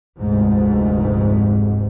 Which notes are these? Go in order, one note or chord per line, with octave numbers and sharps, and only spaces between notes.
F1 D2 G#2